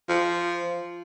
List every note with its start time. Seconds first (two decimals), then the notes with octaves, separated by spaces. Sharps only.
0.09 F3